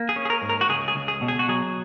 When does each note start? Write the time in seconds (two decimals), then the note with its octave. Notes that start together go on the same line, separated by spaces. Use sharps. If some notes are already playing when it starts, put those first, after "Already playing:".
Already playing: A#3
0.09 G#4
0.16 C#4
0.25 G#4
0.30 A#4
0.42 G#2
0.49 A#4
0.61 F#4
0.69 C#2 G#4
0.88 G#4
0.96 C#2
1.08 G#4
1.21 B2
1.28 G#4
1.39 F#4
1.48 F#3 G#4